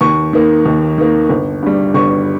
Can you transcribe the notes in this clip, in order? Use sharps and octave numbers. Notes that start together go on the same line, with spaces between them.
D#2 C#6
D#3 A#3
D#2
D#3 A#3
G1
G2 G3
G1 C#6